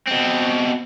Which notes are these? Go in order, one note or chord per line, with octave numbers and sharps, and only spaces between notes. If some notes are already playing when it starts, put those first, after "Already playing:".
B2 C4